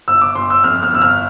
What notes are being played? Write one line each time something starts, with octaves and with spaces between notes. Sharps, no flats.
G1 E6
D6
G1 C6
E6
F2 F6
F6
G1 E6
F6